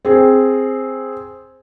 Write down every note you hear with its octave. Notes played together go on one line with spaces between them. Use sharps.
C4 G#4